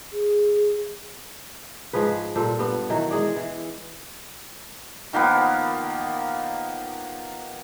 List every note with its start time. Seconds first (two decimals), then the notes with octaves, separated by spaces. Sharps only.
0.13 G#4
1.93 G#2 F3 G#4 B4
2.36 A#2 G3 A4 C5
2.59 G2 B3
2.90 D#3 E3 F#3
3.11 G#3 G#4 D5
3.36 E3
5.13 D#3 F3 A#3 B3